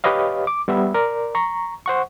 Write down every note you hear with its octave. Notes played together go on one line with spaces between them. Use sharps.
G4 B4 C#5 D#5 F5
D6
G3 B3 E5
A#4 D5
A#5 C#6
C5 F#5 C#6